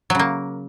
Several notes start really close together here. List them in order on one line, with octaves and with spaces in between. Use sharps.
F#3 C#3 A#3